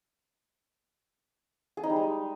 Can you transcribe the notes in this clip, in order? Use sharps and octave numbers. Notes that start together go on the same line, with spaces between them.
G#4
D#4
G3
G#3